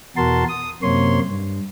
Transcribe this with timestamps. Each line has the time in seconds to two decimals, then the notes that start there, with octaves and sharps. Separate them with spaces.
0.17 E2 B2 F#4 A#4 A5 C6
0.49 D#6
0.83 F#2 C3 A#3 C#5 C6
1.27 G2